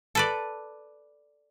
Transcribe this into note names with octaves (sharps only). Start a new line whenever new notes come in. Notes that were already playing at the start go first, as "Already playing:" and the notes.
A4 B4 D5